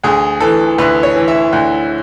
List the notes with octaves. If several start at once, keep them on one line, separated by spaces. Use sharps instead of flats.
D2 G#4
E3 A4
D2 B4
C#5
E3
E5
D2